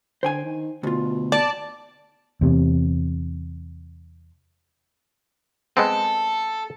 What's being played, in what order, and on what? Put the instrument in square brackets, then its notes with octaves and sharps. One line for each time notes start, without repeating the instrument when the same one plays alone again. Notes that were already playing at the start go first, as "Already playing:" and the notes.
[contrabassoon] D3 [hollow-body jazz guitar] C5 G5 G#5
[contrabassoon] D#3
[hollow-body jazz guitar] D2 F4 [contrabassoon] B2
[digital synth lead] D5 [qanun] A5
[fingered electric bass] E2 C3
[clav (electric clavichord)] G#3 B3 C4 [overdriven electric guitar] A4